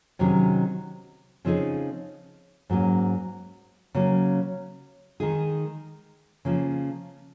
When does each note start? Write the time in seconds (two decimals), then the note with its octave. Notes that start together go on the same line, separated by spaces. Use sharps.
0.19 C3 D#3 F#3 C#4 G#4
1.45 C#3 F3 C4 D#4 G#4
2.70 G#2 F#3 A#3 C#4
3.95 C#3 F#3 A#3 C#4
5.20 D#3 G#3 D#4 G#4
6.45 C#3 F3 A#3 C#4